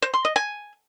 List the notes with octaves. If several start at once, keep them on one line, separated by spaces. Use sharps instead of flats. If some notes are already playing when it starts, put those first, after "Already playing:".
C5
C6
D#5
G#5